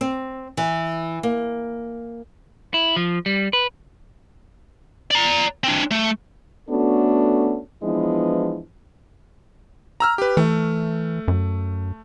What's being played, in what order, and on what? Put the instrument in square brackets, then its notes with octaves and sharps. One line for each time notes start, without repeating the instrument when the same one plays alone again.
[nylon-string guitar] C4
E3
A#3
[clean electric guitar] E4
F3
G3
B4
[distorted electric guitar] D5 A#5
C4 D4
A3
[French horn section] A3 B3 C#4 D4 F#4 A4
E3 F3 G#3 B3 D4 E4
[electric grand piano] A#5 E6 F6
G4 B4
[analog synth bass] E3 [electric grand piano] A3
[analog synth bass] F#2